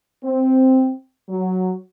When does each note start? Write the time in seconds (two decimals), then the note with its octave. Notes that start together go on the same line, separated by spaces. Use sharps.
0.24 C4
1.29 F#3